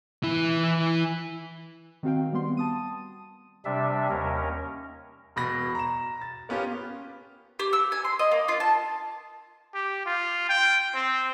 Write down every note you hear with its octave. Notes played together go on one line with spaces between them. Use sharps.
E3 E4
D#3 C4 F#4 F5 G5
G3 B3 C6
A5 D#6 D#7
C3 G3 D4 E5
D#2 C#4 A#4
E1 B2 B5 A#6
A#5 E7
A6
A#3 B3 C#4 F4 G4
G4
E6
G#5
C6
D#5
A#3
F4
A5
G4
F4
G5
C4